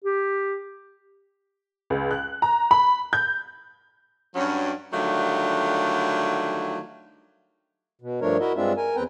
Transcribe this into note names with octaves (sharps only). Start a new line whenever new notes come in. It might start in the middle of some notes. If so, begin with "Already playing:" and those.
G4
C#2
F#6
A#5
B5
G6
G2 F#3 C#4
D3 D#3 F#3 G3 A3 F4
B2
G2 F3 A3 D4 A#4 C#5
E4 F#4 A#4 D#5 E5
G2 G#3 C4 D4 F4 E5
A#4 G#5
E2 C4 B4 G5 A#5